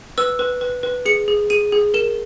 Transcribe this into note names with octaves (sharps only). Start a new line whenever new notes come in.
B4 E6
B4
B4
B4
G#4 C#7
G#4
G#4 D#7
G#4
A#4 E7